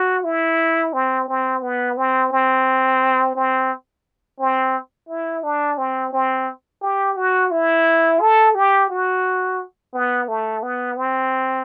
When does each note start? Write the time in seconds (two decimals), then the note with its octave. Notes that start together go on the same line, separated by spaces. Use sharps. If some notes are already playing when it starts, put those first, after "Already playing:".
Already playing: F#4
0.24 E4
0.93 C4
1.28 C4
1.62 B3
1.97 C4
2.32 C4
3.35 C4
4.40 C4
5.09 E4
5.44 D4
5.78 C4
6.13 C4
6.82 G4
7.16 F#4
7.51 E4
8.20 A4
8.55 G4
8.90 F#4
9.94 B3
10.28 A3
10.63 B3
10.97 C4